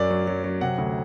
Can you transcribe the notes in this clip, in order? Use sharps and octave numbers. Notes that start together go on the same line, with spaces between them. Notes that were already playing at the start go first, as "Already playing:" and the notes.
Already playing: F#2 F#3 D5
F#3
F#3
F#3
C3 F#5
D2